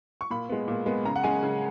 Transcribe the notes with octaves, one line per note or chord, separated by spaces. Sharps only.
C#6
A#2 B5
G#3 B3
A#2
G#3 B3
C#3 A#5
F#5
G#3 C#4 G#5
C#3